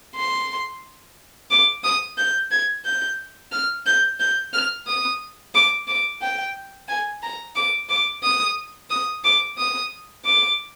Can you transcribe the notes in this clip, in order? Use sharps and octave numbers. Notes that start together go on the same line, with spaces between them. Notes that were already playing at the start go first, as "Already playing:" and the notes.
C6
D6
D#6
G6
G#6
G6
F6
G6
G6
F6
D#6
D6
D6
G5
G#5
A#5
D6
D6
D#6
D#6
D6
D#6
D6